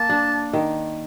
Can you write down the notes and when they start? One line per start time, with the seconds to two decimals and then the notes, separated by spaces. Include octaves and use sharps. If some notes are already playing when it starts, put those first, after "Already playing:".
Already playing: A#3 A5
0.09 D4
0.53 D#3